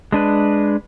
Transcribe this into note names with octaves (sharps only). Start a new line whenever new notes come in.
G#3 D4 B4